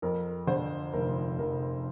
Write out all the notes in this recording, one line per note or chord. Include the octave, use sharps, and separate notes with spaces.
F2 A#4
D3 C5
F1 A#4
F1 A#4